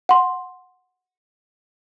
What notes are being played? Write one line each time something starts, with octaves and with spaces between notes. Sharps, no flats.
F#5 C6